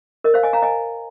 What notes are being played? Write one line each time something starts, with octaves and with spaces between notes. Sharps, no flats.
A#4 D#5
C5 F5
D#5 G#5
F5 A#5
D#5 G#5